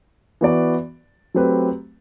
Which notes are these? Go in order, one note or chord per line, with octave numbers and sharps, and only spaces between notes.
E3 B3 F#4 B4 D5
F#3 A3 C4 G4 B4